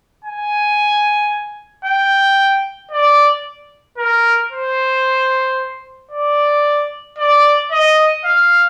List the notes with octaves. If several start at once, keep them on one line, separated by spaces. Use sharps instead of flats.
G#5
G5
D5
A#4
C5
D5
D5
D#5
F5